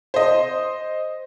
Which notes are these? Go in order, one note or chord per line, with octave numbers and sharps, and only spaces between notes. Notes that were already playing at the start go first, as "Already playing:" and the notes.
C5 D#5